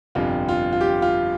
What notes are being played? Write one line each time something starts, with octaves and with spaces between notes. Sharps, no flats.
G1 F2 C3 F4
F4
F4
G4
F4